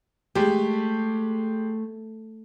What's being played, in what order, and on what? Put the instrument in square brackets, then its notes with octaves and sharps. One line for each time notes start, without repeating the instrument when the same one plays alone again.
[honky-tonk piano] G#3 G4 [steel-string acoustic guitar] A3